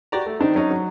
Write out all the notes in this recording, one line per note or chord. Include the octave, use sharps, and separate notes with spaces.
F#4 G4 D5 A#5
A3
D#3 C4 D4 D#4
F#3 C#4 D#4
F#3